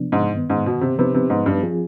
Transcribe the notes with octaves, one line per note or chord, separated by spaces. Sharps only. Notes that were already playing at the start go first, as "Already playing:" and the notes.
Already playing: C3 F3 B3 D4
G#2
G2 D#3 B3
G#2
B2
C3
C3 F3 B3 D#4 B4
C3
G#2
G2
F3 C4 F4 G#4